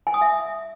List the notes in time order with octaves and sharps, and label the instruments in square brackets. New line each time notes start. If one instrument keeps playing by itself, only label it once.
[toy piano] G#5
D#6
E5